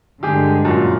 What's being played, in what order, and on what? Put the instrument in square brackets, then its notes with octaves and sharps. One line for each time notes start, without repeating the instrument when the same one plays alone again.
[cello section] G2 D3 G#3 [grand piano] G4 G#4
[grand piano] F#2 A#2